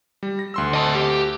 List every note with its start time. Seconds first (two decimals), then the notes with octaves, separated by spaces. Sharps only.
0.23 G3
0.39 A#6
0.54 D2 C6 E6
0.74 D#5 A5
0.95 G4